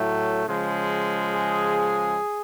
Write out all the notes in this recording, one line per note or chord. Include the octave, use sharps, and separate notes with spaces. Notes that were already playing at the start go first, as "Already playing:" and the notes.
Already playing: A2 F#3 A3
C#3 F3 G#3
G#4